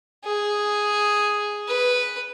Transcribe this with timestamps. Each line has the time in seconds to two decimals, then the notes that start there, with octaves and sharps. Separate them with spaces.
0.25 G#4
1.68 B4